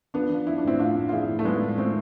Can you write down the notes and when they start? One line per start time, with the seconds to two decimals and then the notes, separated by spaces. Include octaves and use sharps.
0.14 F3 B3 D4
0.30 F3
0.47 F3 E4
0.58 D4
0.64 A2 C4 E4
0.79 A2 D4 F4
0.96 A2
1.09 F4
1.12 F3 E4 G#4
1.29 A2
1.39 A3
1.45 F3 G#3 B3
1.62 A2
1.78 F3 A3 C4